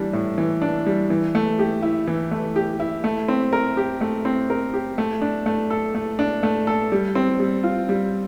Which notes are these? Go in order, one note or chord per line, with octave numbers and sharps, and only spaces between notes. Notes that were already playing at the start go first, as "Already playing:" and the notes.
Already playing: E3 G3 D4
A2
E3
D4
G3
E3
A3
G4
E4
E3
A3
G4
E4
A3
C4
A#4
G4
A3
C4
A#4
G4
A3
D4
A3
A4
A3
D4
A3
A4
G3
C4
G3
F4
G3